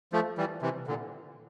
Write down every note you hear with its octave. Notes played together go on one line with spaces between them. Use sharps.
F3 A3
E3 G3
C3 E3
A#2 D3